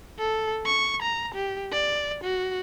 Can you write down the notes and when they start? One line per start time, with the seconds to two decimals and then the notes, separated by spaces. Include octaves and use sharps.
0.19 A4
0.66 C#6
1.02 A#5
1.35 G4
1.72 D5
2.24 F#4